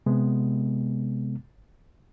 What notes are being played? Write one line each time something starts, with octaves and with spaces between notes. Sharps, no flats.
C3 G#3 B3